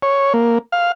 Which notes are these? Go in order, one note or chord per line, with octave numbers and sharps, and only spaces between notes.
C#5
A#3
F5